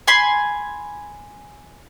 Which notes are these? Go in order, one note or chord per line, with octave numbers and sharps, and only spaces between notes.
G#5 B5 C6